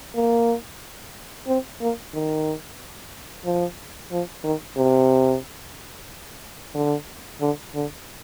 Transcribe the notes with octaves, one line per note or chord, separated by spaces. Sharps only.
A#3
C4
A#3
D#3
F3
F3
D#3
C3
D3
D3
D3